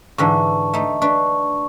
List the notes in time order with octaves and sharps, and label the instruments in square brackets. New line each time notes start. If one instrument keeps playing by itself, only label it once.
[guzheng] G#2 D3 E3 [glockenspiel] A5 C#6
[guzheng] A3 D#4
[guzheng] D4 B4 [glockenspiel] C#6